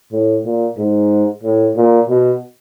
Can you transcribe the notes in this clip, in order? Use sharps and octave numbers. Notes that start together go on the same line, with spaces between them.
A2
A#2
G#2
A2
A#2
B2